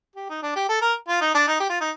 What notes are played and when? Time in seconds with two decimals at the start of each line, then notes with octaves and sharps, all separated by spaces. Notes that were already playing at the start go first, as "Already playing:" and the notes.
0.16 G4
0.29 D#4
0.43 D4
0.56 G4
0.69 A4
0.82 A#4
1.08 F4
1.21 D#4
1.35 D4
1.48 D#4
1.60 G4
1.70 F4
1.81 D#4